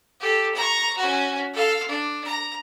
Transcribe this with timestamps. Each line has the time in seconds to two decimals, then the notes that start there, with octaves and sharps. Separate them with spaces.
0.20 G4 A4
0.54 A#5 C#6
0.97 C#4 F#4
1.53 A4 F5
1.88 D4
2.25 A#5